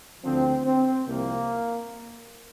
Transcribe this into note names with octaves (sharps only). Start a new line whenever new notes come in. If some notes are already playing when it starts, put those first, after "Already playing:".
D2 D3 F3 C4
C4
C2 C3 F3 A#3